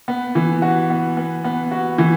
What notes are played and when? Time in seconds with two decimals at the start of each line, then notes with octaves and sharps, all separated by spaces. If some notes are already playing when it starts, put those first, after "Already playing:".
0.08 B3
0.35 E3
0.62 F#4
0.90 B3
1.17 B3
1.44 B3
1.71 F#4
1.98 E3